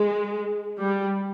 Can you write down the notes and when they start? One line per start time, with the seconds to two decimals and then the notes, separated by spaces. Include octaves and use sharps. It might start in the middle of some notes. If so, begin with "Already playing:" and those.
Already playing: G#3
0.79 G3